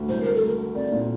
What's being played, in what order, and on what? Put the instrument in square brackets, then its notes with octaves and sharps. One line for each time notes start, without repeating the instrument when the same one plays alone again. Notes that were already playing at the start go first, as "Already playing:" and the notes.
Already playing: [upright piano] D2
[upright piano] C2 [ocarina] C5
[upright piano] A3 [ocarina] A#4
[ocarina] A4
[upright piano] A3
[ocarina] A#4
[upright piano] A3
[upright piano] C4 [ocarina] D5
[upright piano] A#2